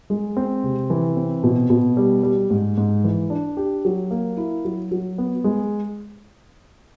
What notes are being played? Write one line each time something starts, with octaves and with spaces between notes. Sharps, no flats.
G#3
C4
C3
E3
C4
B2
B2
G3
G3
G#2
G#2
E3
D4
G4
F#3
A#3
E4
F#3
F#3
B3
G#3